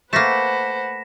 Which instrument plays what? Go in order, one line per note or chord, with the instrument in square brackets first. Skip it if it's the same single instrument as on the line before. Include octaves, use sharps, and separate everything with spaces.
[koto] A3 A#3 [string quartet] B4 C5 F#5 [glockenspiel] A#6 B6 E7